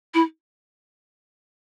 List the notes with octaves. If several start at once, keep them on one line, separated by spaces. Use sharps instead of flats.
E4